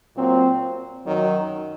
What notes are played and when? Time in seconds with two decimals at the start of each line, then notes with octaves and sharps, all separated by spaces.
0.16 A#2 F#3 C4
1.06 F#2 D#3 F#3